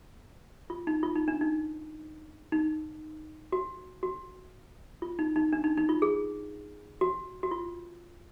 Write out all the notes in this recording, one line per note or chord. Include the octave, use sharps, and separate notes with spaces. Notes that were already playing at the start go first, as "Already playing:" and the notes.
F4
D#4
F4
D#4
D4
D#4
D#4
F#4
F#4
F4
D#4
D#4
D4
D#4
D#4
F4
G#4
F#4
F#4
F4